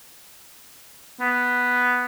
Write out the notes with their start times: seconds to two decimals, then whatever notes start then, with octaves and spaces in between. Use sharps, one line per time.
1.20 B3